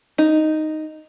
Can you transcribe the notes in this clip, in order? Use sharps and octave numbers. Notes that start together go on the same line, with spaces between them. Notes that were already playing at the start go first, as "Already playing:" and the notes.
D#4